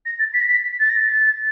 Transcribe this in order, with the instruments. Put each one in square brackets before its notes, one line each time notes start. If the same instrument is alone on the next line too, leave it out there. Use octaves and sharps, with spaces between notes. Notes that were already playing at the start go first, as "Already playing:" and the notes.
[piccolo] A#6
A6
B6
A#6
B6
A6
A#6
A6